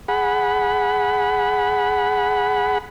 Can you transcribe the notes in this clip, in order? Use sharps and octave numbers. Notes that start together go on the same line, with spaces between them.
G#4 F#5 B5